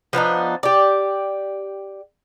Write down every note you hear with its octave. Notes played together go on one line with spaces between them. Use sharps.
F3 B3 D4 D#4
G4 D5